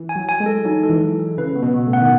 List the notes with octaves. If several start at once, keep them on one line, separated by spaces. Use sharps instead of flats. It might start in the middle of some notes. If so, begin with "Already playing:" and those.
Already playing: E3
G#5
F#3
G#5
G#3
A4
F#3 D#4
A4
E3
A4
A4
C#3 B4
B3
B2
B3
A2
F#5
D#3